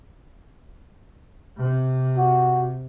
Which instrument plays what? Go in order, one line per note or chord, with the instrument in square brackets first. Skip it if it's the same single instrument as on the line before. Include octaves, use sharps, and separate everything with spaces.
[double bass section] C3
[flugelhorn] F#4